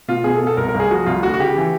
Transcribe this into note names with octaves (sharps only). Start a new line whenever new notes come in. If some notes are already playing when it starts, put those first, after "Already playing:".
B2 F4
B2 G#4
A4
B2
A4
C2 A#4
A#4
C2
G#4
F3 F#4
C2 F4
D2 F#4
F#4
C#3 G4
E3